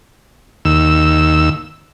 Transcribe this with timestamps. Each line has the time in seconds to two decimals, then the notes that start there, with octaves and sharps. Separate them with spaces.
0.65 D#2 E6